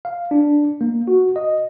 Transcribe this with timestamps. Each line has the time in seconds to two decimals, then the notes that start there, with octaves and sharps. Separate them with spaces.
0.05 F5
0.31 D4
0.81 A#3
1.08 F#4
1.36 D#5